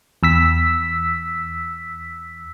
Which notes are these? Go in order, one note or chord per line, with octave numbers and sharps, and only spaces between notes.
E2 E6 B6